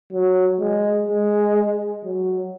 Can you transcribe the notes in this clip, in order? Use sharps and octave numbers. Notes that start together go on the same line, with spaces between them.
F#3
G#3
G#3
F#3